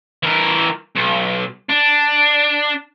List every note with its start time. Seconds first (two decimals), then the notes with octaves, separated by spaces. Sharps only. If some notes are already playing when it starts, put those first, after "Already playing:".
0.23 E3 A#4
0.95 B1
1.70 D4